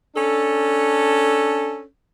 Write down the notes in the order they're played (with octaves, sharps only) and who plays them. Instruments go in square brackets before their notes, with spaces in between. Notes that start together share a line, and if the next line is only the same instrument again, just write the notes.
[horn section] C#4 D4 A4